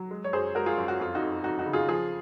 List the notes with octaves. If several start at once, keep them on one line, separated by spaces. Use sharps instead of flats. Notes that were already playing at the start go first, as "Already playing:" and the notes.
Already playing: F#3
G#3
C#5
F#2 G#4 C5
G#3 F#4 A#4
F4 G#4
F#2
F#4
F2 F4
D#4 F#4
F2
F2 D#4 F#4
D#4 F#4
C#3
F4 G#4
F3 F4 G#4